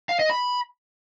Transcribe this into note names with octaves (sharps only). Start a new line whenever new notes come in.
F5
D#5
B5